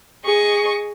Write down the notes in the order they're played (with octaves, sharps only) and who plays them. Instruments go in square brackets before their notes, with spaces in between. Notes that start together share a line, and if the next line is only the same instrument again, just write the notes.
[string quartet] G#4 D#5 C#6